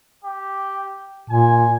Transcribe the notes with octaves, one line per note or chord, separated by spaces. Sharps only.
G4
A#2 G#5